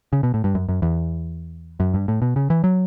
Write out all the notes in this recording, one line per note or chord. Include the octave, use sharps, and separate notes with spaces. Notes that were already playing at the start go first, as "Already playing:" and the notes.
C#3
B2
A2
G2
F#2
F#2
E2
F#2
G2
A2
B2
C#3
E3
F#3